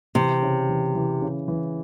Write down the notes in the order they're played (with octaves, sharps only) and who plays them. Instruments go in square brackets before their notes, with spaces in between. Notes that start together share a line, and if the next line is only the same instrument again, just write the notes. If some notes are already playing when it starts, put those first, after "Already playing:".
[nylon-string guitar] C3 [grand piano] E3
[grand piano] C#3
E3
E3
C#3
E3